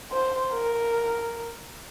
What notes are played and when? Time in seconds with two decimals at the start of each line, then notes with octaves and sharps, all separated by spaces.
0.12 C5
0.53 A#4